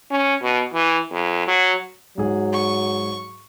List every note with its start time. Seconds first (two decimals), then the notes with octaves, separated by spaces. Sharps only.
0.11 C#4
0.42 B2
0.74 E3
1.12 F2
1.47 F#3
2.18 G#2 F#3 G#4
2.53 C#6